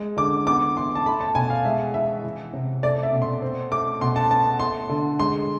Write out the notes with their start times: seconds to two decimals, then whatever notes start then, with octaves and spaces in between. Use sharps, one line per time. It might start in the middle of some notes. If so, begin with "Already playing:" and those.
Already playing: G#3
0.17 D3 D6
0.47 B3 D6
0.77 E3 C6
0.95 A5
1.06 A3 B5
1.21 A5
1.35 B2 G#5
1.50 F5
1.65 G#3 E5
1.94 E3 E5
2.24 E3
2.53 C3
2.83 A3 D5
3.03 E5
3.13 B2
3.22 C6
3.42 C4
3.71 A3 D6
4.01 B2 C6
4.16 A5
4.31 B3 A5
4.60 A3 C6
4.89 D3
5.19 G#3 C6